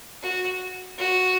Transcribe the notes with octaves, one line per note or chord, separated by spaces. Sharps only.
F#4
F#4